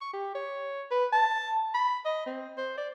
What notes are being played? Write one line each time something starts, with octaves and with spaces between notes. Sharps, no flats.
C#6
G4
C#5
B4
A5
B5
D#5
C4
C5
D5